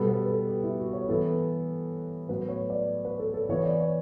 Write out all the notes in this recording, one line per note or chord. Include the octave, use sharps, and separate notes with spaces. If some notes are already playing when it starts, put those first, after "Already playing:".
Already playing: B2 G3 B3 A4
B4
A4
G4
E4
F#4
C#5
E3 B3 A4
A2 F#3 B3 B4
C#5
D5
B4
A4
A4
E3 B3 C#5
D5
C#5